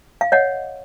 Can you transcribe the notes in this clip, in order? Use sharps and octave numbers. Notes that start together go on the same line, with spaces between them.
F5
C#5 D#5 F#5